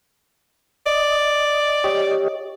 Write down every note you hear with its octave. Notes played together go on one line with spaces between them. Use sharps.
D5 D#5
G4 C#5 D#5